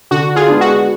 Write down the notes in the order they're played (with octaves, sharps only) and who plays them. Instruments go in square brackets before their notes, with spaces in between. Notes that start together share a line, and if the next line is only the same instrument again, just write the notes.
[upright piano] D3 [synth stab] F#4
[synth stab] F4 G#4
[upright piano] G#3 B3 D4
[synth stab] F#4